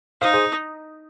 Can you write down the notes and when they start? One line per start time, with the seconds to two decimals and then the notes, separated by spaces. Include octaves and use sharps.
0.21 D#4 C5 F5
0.34 G#4 C5